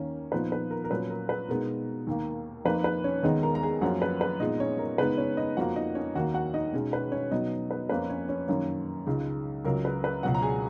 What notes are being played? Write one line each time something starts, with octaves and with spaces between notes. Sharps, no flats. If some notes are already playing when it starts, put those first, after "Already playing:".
Already playing: D#2 D#3 A#3 C#4
A#2 F3 B3 D#4 B4
B4
A#4
A#4
A#2 F#3 C#4 B4
A#4
B4
B2 G#3 B3 D#4 A#4
D#2 D#3 A#3
F2 F3 A#3 D#4 B4
B4
C#4 C#5
D#2 D#3 G#3 B3 D#4 D#5
A#4 A#5
A#5
G#4 G#5
F#2 F3 A#3 C#4 F#4 F#5
B4
B4
A#2 G#3 B3 D#4 D#5
C#4 C#5
A#4
C#3 G#3 B3 D#4 B4
C#4 C#5
D#4 D#5
F2 F3 A#3 F#4 F#5
D#4 D#5
C#4 C#5
D#2 D#3 A#3 F#4 F#5
F#4 F#5
D#4 D#5
B2 G#3 C#4 D#4 C#5
B4
C#4 C#5
B2 F#3 B3 D#4 D#5
B4
F2 F3 A#3 C#4 B4
C#4 C#5
C#4 C#5
F#2 D#3 A#3 C#4
C#2 C#3 G#3 D#4
C#2 C#3 F#3 A#4
B4
B4
C#2 B2 F#3 C#4 F#4 F#5
A#5
G#4 G#5